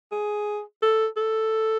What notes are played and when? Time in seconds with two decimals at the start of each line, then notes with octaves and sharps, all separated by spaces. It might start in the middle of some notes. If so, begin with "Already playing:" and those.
0.12 G#4
0.82 A4
1.17 A4